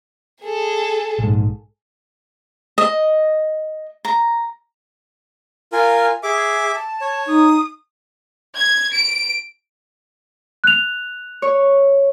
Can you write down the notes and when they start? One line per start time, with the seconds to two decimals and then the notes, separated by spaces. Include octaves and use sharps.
0.43 G#4 A4
1.19 A#1 G#2
2.78 D#5
4.05 A#5
5.73 F4 A#4 G#5
6.23 G#4 E5 D6
6.75 A5
7.01 C#5
7.27 D#4 D#6
8.55 G#6
8.93 D7
10.64 F#6 F7
11.42 C#5